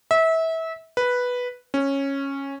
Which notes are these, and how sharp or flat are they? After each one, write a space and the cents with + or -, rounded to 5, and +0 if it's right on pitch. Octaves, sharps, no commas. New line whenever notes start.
E5 -25
B4 -5
C#4 -10